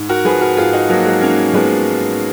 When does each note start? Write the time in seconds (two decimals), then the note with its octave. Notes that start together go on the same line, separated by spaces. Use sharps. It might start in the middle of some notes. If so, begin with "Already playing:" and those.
Already playing: G#2
0.09 F#4 A#4
0.25 F3 G#4 B4
0.41 F#4 A#4
0.57 G#2 F4 G#4
0.73 D#4 F#4
0.89 F3 F#3 A#3
1.06 G#3
1.21 G#2 A#3 C#4
1.54 F3 G#3 B3
1.86 G#2